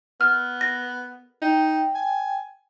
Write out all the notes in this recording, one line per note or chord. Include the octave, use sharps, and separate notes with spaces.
B3 F6
A#6
D#4 G5
G#5